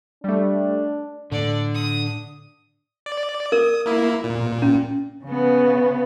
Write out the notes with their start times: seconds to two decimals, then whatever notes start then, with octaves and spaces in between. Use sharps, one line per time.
0.24 G3 A3 D4
1.32 A2 D3 A3 D5
1.75 D#6
3.06 D5
3.52 A#4 D5 D#6
3.86 A#3 E4
4.24 A#2
4.62 C#4
5.24 C#3 B3